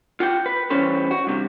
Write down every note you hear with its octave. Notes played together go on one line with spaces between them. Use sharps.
F4 F#5 G5
B4
E3 G3 C#4 B4 C5
F#4
G2 C3